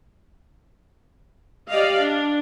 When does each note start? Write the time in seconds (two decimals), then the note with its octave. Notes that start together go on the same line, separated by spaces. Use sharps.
1.69 G4 D5 D#5 F5
1.98 D4